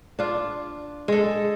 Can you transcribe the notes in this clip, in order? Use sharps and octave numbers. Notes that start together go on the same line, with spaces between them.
D4 F4
G#3 A4